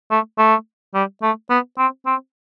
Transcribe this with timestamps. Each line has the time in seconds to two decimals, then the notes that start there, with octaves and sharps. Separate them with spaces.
0.11 A3
0.38 A3
0.95 G3
1.22 A3
1.50 B3
1.78 C4
2.06 C4